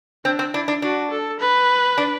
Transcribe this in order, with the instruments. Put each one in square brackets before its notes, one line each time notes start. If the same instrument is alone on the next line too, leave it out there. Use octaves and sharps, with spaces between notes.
[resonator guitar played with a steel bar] C4 [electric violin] D4
[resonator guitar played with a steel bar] C4
[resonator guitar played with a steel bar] D4 [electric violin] E4
[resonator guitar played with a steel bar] D4
[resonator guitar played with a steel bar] D4 [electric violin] F#4
[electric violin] A4
B4
[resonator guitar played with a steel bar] D4